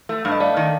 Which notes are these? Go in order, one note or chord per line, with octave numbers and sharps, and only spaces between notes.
A3
G2
D#5
A3 D5 F5
D#3